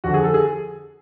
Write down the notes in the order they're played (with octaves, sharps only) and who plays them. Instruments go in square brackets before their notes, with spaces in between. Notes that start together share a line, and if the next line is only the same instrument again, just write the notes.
[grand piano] F2 D3 F#4
G#4
A4
G#4